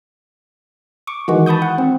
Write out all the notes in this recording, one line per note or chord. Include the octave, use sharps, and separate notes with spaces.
C#6 D6
D#3 E3 G#3 F#4
A5 B5 C#6 D#6 G6
F#5
C4